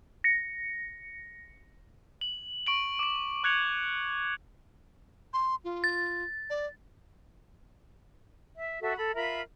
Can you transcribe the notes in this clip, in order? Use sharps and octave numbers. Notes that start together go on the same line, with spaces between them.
A#6 C#7
F#7
C#6 D7 F#7
D6 D7
C#6 F#6 G#6 C#7 F7
C6
F4
A6
D5
E5
F#4 A4 E5
A4 B5
F4 A#4 E5 B5